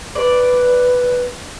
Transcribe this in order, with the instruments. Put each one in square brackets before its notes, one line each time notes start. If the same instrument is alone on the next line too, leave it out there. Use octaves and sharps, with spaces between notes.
[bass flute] B4 [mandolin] D5